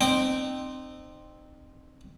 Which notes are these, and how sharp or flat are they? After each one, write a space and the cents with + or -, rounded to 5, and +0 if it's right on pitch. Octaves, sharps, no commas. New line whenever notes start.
C4 +0 D#4 -35 G5 +0